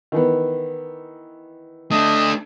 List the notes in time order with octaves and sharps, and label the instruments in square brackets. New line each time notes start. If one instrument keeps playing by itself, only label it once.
[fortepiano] D#3 E3 B3
[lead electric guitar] A3 D4 [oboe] D#5